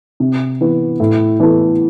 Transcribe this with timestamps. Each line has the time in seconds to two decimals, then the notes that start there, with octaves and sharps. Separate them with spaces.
0.20 C3
0.61 E3 B3
1.00 A2
1.40 E3 B3 E4 A4